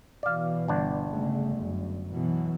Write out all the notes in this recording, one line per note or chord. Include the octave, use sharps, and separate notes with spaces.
B2 E3 D5 F5
G1 D4
C#3 G#3 A3
F#2
B2 E3 F#3